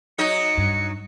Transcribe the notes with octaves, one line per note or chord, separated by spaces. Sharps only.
F#3 D#4 D#5 C#7
G2